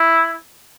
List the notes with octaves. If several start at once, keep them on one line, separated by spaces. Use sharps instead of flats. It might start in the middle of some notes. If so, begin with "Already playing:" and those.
Already playing: E4